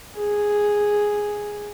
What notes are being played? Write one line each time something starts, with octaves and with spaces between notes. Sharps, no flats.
G#4